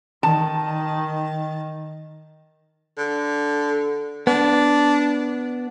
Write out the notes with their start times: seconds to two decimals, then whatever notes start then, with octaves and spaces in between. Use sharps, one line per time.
0.23 D#3 A5
2.98 D3
4.27 B3 D4